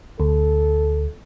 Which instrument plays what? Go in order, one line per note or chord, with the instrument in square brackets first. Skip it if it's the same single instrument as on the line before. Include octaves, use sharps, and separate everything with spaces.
[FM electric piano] D2 [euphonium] A4